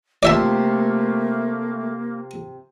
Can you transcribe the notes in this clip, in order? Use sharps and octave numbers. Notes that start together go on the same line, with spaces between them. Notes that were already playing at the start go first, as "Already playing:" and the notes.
C3 F3 A3 A#3 D5 E5 A5